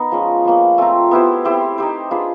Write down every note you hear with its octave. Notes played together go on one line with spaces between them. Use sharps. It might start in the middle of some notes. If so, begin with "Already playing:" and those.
Already playing: B3 D#4 A#4
F3 G#3 C#4
F3 A#3 C#4
A3 C4 F4 A#4
B3 E4 G4 C5
C4 E4 G4 C5
D#4 G4 C5
D4 F4 G#4 B4